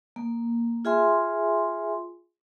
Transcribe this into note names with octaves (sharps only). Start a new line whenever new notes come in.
A#3
F4 G#4 E5 G#5 C6